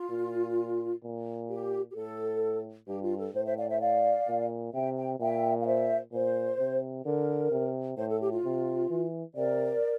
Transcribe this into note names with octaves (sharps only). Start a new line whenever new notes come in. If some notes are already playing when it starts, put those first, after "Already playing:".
Already playing: F4
A#2
A#2
G4
G4
A2 A4
G2 G4
F4
A4
A2 C5
C5 E5
D5 F5
C5 E5
D5 F5
A#2
C3 E5 G5
G5
A#2 E5 G5
F5
C5 E5
A#2 C5
C3
D3 A#4
C3
A2 C5
A4
G4
F4
C3
E3
C3 A#4 D5